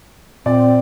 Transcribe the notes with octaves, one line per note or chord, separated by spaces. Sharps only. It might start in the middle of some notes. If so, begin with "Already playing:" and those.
A#2 C4 D5